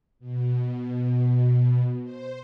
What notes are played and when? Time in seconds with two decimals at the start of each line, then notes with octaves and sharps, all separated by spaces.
0.19 B2
2.03 C5